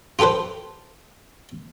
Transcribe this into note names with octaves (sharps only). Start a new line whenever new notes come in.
F4 G4 A4 B4 C5